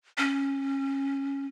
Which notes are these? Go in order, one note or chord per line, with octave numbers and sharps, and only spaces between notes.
C#4